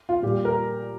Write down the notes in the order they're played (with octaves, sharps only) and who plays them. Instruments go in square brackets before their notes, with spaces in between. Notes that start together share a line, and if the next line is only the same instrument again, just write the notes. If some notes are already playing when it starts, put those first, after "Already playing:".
[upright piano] F4
A#2 G3 G4
A#4